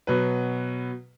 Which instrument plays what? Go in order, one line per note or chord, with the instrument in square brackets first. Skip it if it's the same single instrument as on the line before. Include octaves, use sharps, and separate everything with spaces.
[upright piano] B2 F#3 B4